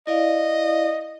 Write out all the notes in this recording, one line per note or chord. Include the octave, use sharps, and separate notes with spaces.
E4 D5 D#5 F5